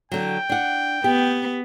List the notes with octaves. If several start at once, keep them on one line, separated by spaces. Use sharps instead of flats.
D3 F#3 G5
D4 F#5
B3 G4